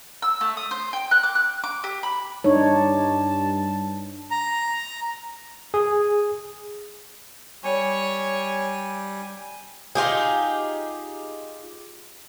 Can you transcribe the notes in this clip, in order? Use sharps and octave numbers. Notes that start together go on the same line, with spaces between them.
E6
A3
D#6
C5
G5
F#6
D6
F#6
D6
G4
B5
G2 D4 D#4 C#5 A5
A#5
G#4
G3 C#5 G#5
D#4 F4 G4 G#4